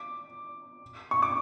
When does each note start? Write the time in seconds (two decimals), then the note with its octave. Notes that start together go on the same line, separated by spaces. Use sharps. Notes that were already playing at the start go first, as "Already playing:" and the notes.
Already playing: D6
1.11 C#6
1.22 D6